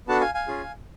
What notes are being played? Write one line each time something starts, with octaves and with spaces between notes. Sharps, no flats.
B3 D4 F#4 A4 F#5 A5
F5 G#5
F5 G#5
C#4 F4 G#4